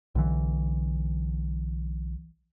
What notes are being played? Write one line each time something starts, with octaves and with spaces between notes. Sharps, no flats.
B1 D3 E3